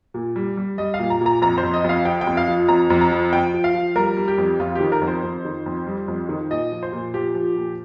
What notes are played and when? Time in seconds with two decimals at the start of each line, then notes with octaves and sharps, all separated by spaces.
0.14 A#2
0.36 G3
0.57 G3
0.78 G3 D#5
0.94 F5
0.99 A#2
1.10 A#5
1.21 A#2
1.26 A#5
1.42 F2 A#5
1.58 C5
1.63 F2
1.74 D#5
1.84 F2 F5
2.05 F3 G5
2.21 G5
2.27 F2
2.37 F5
2.48 F3
2.68 F2 A#5
2.90 F2
3.01 A#5
3.11 F3
3.33 F3 G5
3.54 F3
3.64 F5
3.74 F3
3.95 G3 A#4
4.17 G3
4.28 G4
4.38 F2
4.60 F2 F4
4.75 G4
4.80 D#3
4.92 A#4
5.02 F2
5.07 C5
5.23 F2
5.45 D#3
5.66 F2
5.87 G3
6.08 F2
6.29 D#3
6.50 A#2 D#5
6.72 F3
6.83 C5
6.93 A#2
7.14 F3 G4
7.35 F3
7.56 A#2